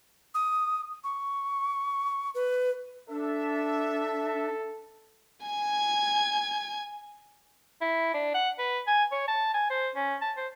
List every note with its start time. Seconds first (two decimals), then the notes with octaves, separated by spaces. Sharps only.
0.34 D#6
1.04 C#6
2.35 B4
3.10 D4 A4 E5
5.46 G#5 G#6
7.81 E4
8.14 D4
8.34 F#5
8.59 B4
8.87 G#5
9.12 C#5
9.28 A5
9.54 G#5
9.70 C5
9.95 C#4
10.21 A5
10.37 C5